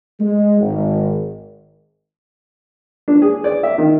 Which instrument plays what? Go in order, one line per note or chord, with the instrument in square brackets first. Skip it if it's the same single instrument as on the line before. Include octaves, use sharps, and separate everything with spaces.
[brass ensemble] G#3
G#1
[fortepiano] D4
G#4
D5
E5
D#3